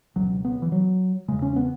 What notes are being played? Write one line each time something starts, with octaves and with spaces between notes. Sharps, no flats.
C#2 B2 F#3
B3
E3
F#3
E2 C#3 G#3
C#4
B3